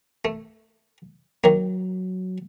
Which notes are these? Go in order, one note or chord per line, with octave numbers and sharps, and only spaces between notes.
A3
D#3 F#3 A#3